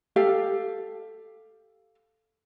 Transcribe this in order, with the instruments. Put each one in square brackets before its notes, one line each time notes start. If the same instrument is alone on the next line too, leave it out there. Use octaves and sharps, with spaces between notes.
[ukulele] G4 A4 F5